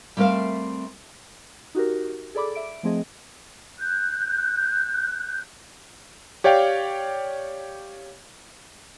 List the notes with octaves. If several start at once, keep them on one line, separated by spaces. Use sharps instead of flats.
G3 A3 C4 A#4 E5 F5
D#4 F#4 G4 A#4
G#4 A4 D5 B5 D6
E5 D7
F3 A3 C4 G#4 D#5
F#6 G6
G4 C#5 D5 F5 G5